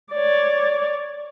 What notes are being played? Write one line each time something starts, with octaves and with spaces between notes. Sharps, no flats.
C#5 D5